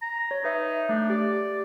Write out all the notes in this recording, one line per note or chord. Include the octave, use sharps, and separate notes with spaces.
A#5
C#5
D#4 B4 E5
A3 D4
G4 D5